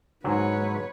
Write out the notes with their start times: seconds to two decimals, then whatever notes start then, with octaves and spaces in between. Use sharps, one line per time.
0.24 G#2 F#3 B4 C#5